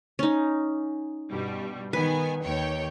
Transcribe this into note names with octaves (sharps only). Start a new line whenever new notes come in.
C#4 D#4
G2 B2 G3
D#3 B3 B4 G#5
D#2 C#5 G5